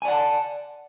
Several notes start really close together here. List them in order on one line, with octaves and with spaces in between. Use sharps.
G#5 D5 F#5 A5